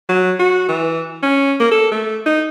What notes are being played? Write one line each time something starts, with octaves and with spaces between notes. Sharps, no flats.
F#3
F#4
E3
C#4
A#3
A4
A3
D#4